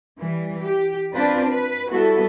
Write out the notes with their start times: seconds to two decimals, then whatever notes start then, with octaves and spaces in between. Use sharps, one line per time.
0.19 E3 G3
0.63 G4
1.14 C4 D4 F4 B4 C5
1.48 B4
1.91 G3 B3 E4 F#4 A4